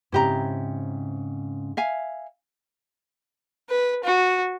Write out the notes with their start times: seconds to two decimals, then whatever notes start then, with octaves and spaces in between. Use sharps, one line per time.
0.12 G#2 C#3 C4 E4 G4 A#5
1.77 E5 F5 G#5
3.70 B4
4.04 F#4